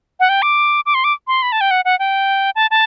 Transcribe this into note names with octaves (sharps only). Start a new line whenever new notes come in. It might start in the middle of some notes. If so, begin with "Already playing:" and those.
F#5
G5
D6
D6
C6
D6
C6
B5
A5
G5
F#5
F#5
G5
A5
A5